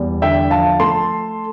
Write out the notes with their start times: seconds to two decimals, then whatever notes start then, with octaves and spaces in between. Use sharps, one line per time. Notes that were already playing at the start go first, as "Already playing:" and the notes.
Already playing: E2 G3
0.22 D3 E5 G5
0.50 F3 F5 A5
0.80 A3 A5 C6